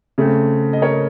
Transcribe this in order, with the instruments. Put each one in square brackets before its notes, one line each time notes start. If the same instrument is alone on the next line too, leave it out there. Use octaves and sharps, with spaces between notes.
[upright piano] C#3 A3 C4
D#5
A#4 C#5